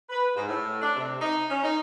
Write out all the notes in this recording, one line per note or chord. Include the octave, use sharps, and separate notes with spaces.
B4
G#2
A2
D4
C3
D#4
C#4
D#4